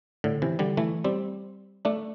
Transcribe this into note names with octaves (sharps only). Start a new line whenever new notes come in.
A2 D3
C3 E3
D3 G3
E3 A3
G3 C4
A3 D4